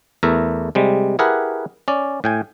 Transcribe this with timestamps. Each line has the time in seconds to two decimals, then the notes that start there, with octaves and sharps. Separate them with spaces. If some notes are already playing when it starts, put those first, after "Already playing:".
0.23 E2 A3 A#4 E5
0.75 C3 G3 G#3
1.19 E4 G4 G#4 A#4 B4 F#5
1.88 C#4 D5
2.24 A2 G5 G#5